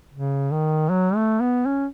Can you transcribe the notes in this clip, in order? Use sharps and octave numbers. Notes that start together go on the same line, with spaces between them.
C#3
D#3
F#3
A3
B3
C#4